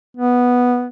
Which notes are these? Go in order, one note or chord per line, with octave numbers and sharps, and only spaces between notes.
B3